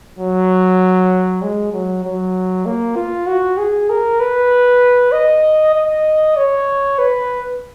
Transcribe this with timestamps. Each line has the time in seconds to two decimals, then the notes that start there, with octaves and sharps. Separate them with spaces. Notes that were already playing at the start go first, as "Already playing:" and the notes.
0.19 F#3
1.42 G#3
1.72 F#3
2.04 F#3
2.65 A#3
2.96 F4
3.27 F#4
3.58 G#4
3.90 A#4
4.20 B4
5.12 D#5
5.74 D#5
6.37 C#5
6.98 B4